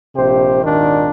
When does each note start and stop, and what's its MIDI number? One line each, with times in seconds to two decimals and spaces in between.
0.16 0.63 34
0.16 0.63 48
0.16 0.63 67
0.16 0.63 72
0.64 1.10 32
0.64 1.10 39
0.64 1.10 46
0.64 1.10 51
0.64 1.10 62